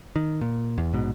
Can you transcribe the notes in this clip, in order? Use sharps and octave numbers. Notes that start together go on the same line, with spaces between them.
D#3
A#2
E2
A#1 G#2 B2